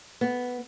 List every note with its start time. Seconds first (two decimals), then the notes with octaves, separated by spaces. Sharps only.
0.21 B3